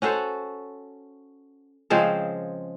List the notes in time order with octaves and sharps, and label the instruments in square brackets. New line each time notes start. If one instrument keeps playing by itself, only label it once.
[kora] C#4 F#4 A4 C5
C#3 F3 G#3 C4